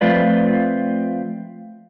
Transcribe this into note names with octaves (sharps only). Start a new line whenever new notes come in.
F3 A3 C4 F4 B4 D5